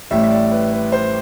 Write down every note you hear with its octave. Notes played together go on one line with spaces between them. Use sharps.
A1 A2 G3 E5
E5
D5
B4
B4
C5